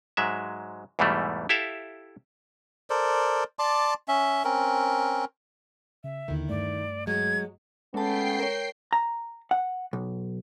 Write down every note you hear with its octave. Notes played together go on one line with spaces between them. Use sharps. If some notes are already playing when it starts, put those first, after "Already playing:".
G#2 F#3 G#3 E5
E2 G#2 B2 E3 G3 A3
E4 G4 A4 E5 F5
A4 A#4 C5 D5
D5 A5 C6 D6
C#4 E5
C4 C#4 A#4
C#3 E5
D#2 D3 D#3 E4
G2 A3 D5
F#3 G#3 G#6
G#3 A3 B3 C#4 G5 A5 C7
A#4 C#5
A#5
F#5
B1